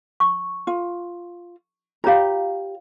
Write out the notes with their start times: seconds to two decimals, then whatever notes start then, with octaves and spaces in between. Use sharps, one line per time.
0.20 C#6
0.67 F4
2.04 F4 G4 C#5 F5 A#5